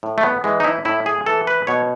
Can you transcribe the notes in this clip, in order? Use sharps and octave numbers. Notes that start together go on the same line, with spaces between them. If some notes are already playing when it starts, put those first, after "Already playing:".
A2
A3
B3
E3 G#3
D#4
E4
A2 E4
G#4
E3 A4
B4
B2 C#5